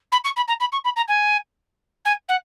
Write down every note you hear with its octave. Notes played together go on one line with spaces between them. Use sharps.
B5
C#6
B5
A#5
B5
C#6
B5
A#5
G#5
G#5
F#5